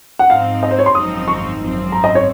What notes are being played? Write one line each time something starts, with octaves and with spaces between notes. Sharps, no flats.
F#5
G#2 F3 C4 D#4 F5
D#5
C5
C#5
C6
G#1 F#2 F3 C4 D#4 D#6
C#6
G#1 F#2 F3 C4
A#5
D#5
C#5